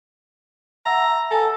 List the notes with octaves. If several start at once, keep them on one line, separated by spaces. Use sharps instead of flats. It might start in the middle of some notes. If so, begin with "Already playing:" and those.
E5 F#5 A#5 E6
A4 G#5 A5 E6